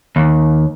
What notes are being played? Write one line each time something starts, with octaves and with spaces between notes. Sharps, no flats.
D#2